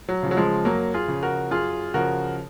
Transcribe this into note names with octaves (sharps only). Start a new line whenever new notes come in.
F#3
C#3 F3
F#3
F3 G#3
F#2 F#3 A#3
F4 G#4
C#3 F3
F#4 A#4
F#2 F4 G#4
C#3 F3 F#4 A#4